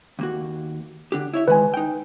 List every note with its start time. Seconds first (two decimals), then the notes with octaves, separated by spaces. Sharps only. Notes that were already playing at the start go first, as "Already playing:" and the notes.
0.19 D#2 A#3 F#4
1.12 D3 D4 G4
1.33 E4 C#5 E5
1.48 D#3 G#3 B4 G#5
1.74 D#4 G5